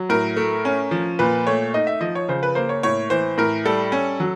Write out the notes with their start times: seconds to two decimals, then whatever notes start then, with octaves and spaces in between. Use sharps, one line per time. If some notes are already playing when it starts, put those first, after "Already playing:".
Already playing: F#3
0.10 A2 A#4
0.36 A3
0.65 C#4
0.91 F3
1.19 A#2 B4
1.47 A3 C#5
1.74 D#4 D#5
1.87 E5
2.01 F3 D#5
2.15 C#5
2.29 C#3 C5
2.43 B4
2.55 A#3 C5
2.69 C#5
2.83 A2 C#5
3.10 E3 C5
3.38 A2 A#4
3.65 G3 A4
3.92 C#4
4.20 F#3